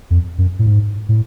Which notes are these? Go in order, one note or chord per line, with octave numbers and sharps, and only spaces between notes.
F2
F#2
A2
G#2
A2